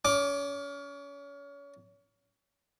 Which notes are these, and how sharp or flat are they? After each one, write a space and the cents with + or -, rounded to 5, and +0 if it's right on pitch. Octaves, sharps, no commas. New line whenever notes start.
C#4 +30 D6 +0